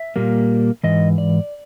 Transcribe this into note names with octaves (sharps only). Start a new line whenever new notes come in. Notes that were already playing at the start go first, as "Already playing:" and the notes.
Already playing: E5
A#2 G3 A#3
G#2 E3 D#5
D5